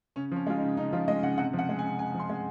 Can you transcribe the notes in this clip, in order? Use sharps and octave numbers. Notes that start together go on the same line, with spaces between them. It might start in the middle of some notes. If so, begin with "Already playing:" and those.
C#3 C#4
F3 C#4
G#3 F4
D#4
C#3
C#3 D#4
F3 F4
G#3 D#5
C#3 F#5
C3 F#5
F3
F#5
G#3
G#5
C3
C3 G#5
F3
C6
G#3